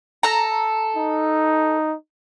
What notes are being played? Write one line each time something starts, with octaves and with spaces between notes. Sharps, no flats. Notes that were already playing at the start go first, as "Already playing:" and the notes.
A4 A#5
D#4